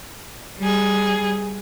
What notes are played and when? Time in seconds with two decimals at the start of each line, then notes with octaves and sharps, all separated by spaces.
0.59 G3 G#4